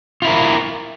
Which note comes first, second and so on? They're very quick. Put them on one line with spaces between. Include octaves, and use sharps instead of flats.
F4 E4 A#4